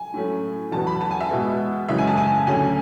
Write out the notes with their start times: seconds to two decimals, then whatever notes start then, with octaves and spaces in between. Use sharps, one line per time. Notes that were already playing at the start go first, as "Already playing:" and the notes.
Already playing: G#5
0.14 A2 F#3 A3 C#4
0.72 E2 B2 F#3 B3 A5
0.87 B5
1.01 A5
1.11 G#5
1.20 E5
1.30 B2 G#3 B3
1.88 F#2 C#3 E3 G#3 C#4 E5
1.98 G#5
2.07 A5
2.17 G#5
2.46 D2 D3 F#3 C#4 G#5